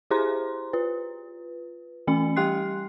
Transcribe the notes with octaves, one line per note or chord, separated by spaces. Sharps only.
E4 G4 G#4 C5 A#5 C6
F4 B4
E3 A3 C#4 G#5 C#7
G3 G4 G5 C6 F#6 C7